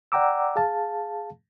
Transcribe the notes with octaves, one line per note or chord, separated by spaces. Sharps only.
D5 F#5 G5 A#5 D6 E6
G#4 F5 A5